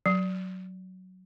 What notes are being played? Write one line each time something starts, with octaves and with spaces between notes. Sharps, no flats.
F#3